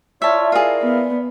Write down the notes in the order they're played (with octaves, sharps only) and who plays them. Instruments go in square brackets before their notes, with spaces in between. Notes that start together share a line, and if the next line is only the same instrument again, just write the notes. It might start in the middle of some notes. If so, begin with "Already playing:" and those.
[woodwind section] E4 F4 C#5 [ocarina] D5 [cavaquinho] E5 A5
[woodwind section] E4 A#4 F5 [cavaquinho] F4 G#4
[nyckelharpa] B3